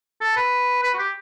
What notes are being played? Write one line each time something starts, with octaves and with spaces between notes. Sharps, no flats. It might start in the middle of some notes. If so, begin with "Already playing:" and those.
A4
B4
B4
F#4
G4